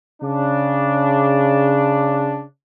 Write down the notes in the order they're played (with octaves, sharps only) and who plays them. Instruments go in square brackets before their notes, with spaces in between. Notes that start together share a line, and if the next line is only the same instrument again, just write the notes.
[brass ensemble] C#3 D4